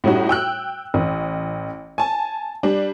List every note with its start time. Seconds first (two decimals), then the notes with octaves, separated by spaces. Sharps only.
0.04 A2 G3 C#4 D#4 F#4
0.29 G5 E6 F#6
0.94 A1
1.98 G#5 A5
2.63 G3 D4